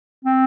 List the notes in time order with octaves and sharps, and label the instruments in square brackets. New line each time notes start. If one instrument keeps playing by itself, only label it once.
[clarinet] C4